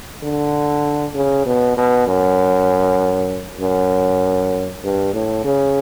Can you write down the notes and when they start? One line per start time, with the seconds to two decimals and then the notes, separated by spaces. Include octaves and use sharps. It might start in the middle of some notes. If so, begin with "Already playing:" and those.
0.23 D3
1.15 C#3
1.46 B2
1.77 B2
2.07 F#2
3.60 F#2
4.84 G2
5.14 A2
5.45 C#3